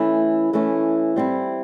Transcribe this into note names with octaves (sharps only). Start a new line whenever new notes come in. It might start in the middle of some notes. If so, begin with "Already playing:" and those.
Already playing: E3 A3 C#4 E4
E3 A3 C#4 E4
G3 C4 E4